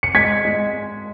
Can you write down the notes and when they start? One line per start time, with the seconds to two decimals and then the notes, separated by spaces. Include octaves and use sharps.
0.03 C#7
0.15 G#3 G#6 B6
0.45 G#3